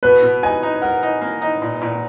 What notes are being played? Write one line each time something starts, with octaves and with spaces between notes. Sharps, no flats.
B2 B4
B2
D#4 G#5
D#4
A#4 F#5
D#4
A#3
D#4
A#2
A#2